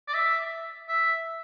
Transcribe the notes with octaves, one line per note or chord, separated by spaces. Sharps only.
D5
E5
E5